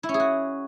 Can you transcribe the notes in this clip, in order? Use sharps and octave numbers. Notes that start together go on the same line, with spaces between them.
E4
C#4
G#4
F#4